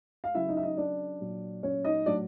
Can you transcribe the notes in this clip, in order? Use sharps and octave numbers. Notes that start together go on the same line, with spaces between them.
F5
C#3 F#3 E4 E5
D#4 D#5
E5
D#4 D#5
D4 D5
A#2 F#3
C#4 C#5
D#4 D#5
A2 F#3 D4 D5